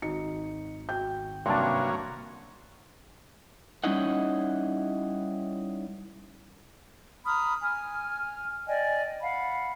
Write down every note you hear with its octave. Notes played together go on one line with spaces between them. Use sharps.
G#1 D#4 F#4 C#7
F#4 G5 G6
G2 C3 F#3 A#3 C#4 D4 A5 C6
G3 C#4 D#4 E4 D#5 F#5
A#5 B5 D#6 F6
G#5 F6
D5 D#5 G5 G#5
F5 F#5 B5